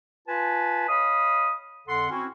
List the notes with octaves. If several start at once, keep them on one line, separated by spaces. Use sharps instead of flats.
F4 B4 G#5 A5
C#5 D#5 F5 B5 D#6
F2 D3 A4 F#5 C6
C4 C#4 E4 F#4